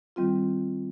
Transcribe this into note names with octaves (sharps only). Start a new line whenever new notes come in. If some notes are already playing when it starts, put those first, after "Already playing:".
D#3 G3 C4 F4